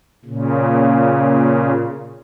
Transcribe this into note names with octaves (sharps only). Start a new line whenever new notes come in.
A#2 C#3